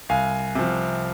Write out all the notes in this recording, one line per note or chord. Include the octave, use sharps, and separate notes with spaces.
C2 F5 G#5
C3 F3